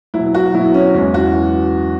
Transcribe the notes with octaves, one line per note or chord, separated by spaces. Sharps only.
B2 F#3 E4
F#4
B2 F#3 E4
C#4
E2 E3 G#3 C#4
F#4